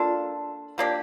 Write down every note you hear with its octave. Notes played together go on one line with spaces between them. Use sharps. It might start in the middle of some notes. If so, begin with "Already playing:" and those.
Already playing: A#3 D4 F4 A4
F3 A#3 D4 G4